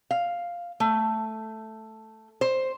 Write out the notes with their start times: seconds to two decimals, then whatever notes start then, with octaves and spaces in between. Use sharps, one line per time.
0.11 F5
0.80 A3
2.41 C5